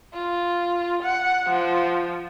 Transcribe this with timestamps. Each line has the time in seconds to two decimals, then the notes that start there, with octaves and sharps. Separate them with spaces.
0.14 F4
1.03 F#5
1.49 F3